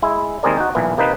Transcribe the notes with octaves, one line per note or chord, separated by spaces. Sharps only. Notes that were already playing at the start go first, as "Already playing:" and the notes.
G#3 E4
D#2 G#3 C4 G#4 A#4 D5
D#4 F#4
B1 A#2 E3
C3 A#3 D#4 B4